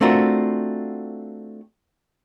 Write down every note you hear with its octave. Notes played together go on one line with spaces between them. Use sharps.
A3 C4 D4 F4 F#4 A#4